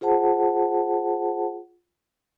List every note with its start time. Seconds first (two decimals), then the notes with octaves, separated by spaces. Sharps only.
0.01 F4 G#4 C5 F#5 A5